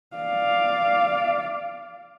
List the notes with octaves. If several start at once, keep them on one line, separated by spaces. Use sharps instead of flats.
D5 F5